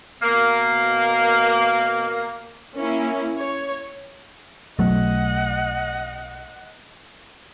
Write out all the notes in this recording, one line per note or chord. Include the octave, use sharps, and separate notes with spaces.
B2 A#3
A#3 C#4 E4
C#5
B1 F#3 A3 D#5 F#5